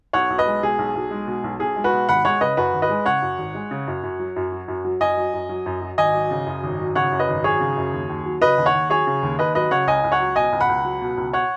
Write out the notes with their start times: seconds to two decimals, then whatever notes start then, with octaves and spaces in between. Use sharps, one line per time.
0.13 B1 C#5 F#5
0.30 B1
0.38 B4 D#5
0.46 G#3
0.63 B2 G#4
0.78 B1
0.95 B1
1.11 G#3
1.27 B2
1.44 B1
1.59 B1 G#4
1.76 G#3
1.84 F#4 B4
1.93 B2
2.08 G#1 F#5 B5
2.25 G#3 C#5 F#5
2.41 C#3 B4 D#5
2.57 F#2 F#4 B4
2.74 G#1
2.82 B4 D#5
2.89 G#3
3.06 C#3 C#5 F#5
3.22 F#2
3.39 G#1
3.55 G#3
3.71 C#3
3.88 F#2
4.03 F#2
4.20 F#3
4.36 F#2
4.52 F#3
4.68 F#2
4.85 F#3
5.01 F#2 D#5 G#5
5.17 F#3
5.33 F#2
5.49 F#3
5.66 F#2
5.81 F#3
5.98 G#1 D#5 G#5
6.14 F#3
6.31 C#3
6.47 F#2
6.63 G#1
6.79 F#3
6.95 C#3 C#5 F#5
7.12 F#2
7.19 B4 D#5
7.28 G#1
7.44 F#3 G#4 C#5
7.60 C#3
7.77 F#2
7.93 D#2
8.09 D#2
8.26 F#3
8.41 C#3 B4 D#5
8.58 D#2
8.66 C#5 F#5
8.74 D#2
8.90 F#3 G#4 C#5
9.07 C#3
9.23 D#2
9.39 D#2 B4 D#5
9.55 F#3 B4 D#5
9.71 C#3 C#5 F#5
9.87 C#2 D#5 G#5
10.04 C#2
10.12 C#5 F#5
10.20 F#3
10.36 B2 D#5 G#5
10.52 C#2
10.60 F#5 B5
10.69 C#2
10.85 F#3
11.01 B2
11.17 C#2
11.33 C#5 F#5